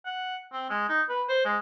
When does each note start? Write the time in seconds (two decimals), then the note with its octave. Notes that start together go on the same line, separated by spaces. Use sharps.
0.05 F#5
0.52 C4
0.70 G#3
0.89 D#4
1.09 B4
1.29 C5
1.45 G#3